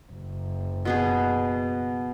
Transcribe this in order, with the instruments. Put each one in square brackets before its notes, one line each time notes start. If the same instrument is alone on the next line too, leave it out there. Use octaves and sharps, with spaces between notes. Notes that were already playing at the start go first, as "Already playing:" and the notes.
[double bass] F#1
[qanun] B2 B3 G#4